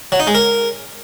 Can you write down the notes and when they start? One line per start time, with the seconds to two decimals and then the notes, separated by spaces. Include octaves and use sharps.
0.12 F#3
0.20 D#4
0.27 G#3
0.35 A#4